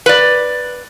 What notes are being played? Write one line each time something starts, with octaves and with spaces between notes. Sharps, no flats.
B4 D5